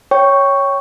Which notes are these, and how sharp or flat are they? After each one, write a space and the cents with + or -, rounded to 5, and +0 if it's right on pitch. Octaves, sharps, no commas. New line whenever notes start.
C#5 +0 G5 +0 C#6 +0